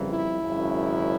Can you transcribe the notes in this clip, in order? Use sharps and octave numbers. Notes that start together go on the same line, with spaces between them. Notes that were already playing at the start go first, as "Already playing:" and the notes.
Already playing: F2 C#3 E3 G3 A#3
E4
G#1 F#2 C#3